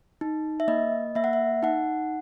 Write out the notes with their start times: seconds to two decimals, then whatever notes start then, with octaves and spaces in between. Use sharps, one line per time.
0.21 D#4
0.60 E5
0.68 A#3 D#5
1.15 A#3 E5
1.24 F#5
1.33 E5
1.63 D#4 F#5